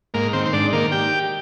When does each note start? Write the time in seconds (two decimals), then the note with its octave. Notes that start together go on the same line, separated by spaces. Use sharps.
0.14 G#2 A#3 A#4
0.33 D#3 C4 C5
0.46 C5
0.53 G#2 D4 D5
0.73 D#3 A#3 A#4
0.92 G4 G5